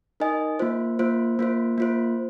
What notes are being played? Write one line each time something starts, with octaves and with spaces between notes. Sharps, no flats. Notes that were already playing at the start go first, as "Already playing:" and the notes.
D#4 A#4 D#5 G#5
A#3 F4 C5
A#3 F4 C5
A#3 F4 C5
A#3 F4 C5